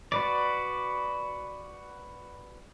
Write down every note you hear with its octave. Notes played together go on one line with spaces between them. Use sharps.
F#4 B4 D5